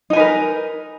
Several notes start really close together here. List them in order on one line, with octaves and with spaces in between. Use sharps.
D#4 G#5 B4 A#4